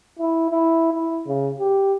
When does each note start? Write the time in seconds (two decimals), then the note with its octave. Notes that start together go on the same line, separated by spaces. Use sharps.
0.19 E4
0.51 E4
0.93 E4
1.27 C#3
1.60 G4